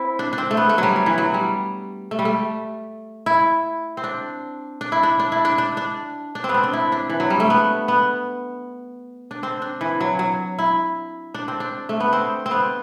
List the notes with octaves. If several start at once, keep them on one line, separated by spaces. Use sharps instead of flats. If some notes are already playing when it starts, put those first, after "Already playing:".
Already playing: C4 E4
D4
D4
C4
A3
B3
A3
F#3 G3
F#3
E3
F#3
G3
A3
G3
A3
E4
C4
D4
D4
E4
D4
D4
E4
D4
D4
D4
D4
C4
B3
C4
D4
E4
D4
E3
F#3
G3
A3
B3
B3
D4
C4
D4
E3
F#3
F#3
E4
D4
C4
D4
A3
B3
C4
C4
B3